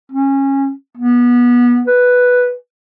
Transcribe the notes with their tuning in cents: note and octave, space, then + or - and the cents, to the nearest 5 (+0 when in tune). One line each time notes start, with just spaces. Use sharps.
C#4 -20
B3 -25
B4 +0